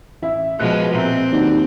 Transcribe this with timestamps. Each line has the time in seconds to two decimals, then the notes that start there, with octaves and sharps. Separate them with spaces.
0.22 A1 E4 E5
0.59 B2 F3 G#3 F#6
0.94 A#2 C4 E5 A#5
1.32 D#2 D4 F#4